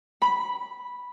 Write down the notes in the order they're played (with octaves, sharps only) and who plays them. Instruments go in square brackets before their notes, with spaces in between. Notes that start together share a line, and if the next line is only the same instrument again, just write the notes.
[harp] B5